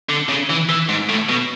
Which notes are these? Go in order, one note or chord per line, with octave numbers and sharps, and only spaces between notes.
D3
C#3
E3
E3
G#2
A2
B2